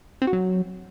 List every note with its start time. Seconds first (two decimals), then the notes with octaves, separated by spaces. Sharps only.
0.22 C4
0.27 F#4
0.33 F#3